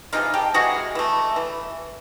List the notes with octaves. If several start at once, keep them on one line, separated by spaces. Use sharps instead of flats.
C3 E3 G#3 D#4 F4
G4 A4
C3 E3 G#3 F#4 G#4
E3 A3
E3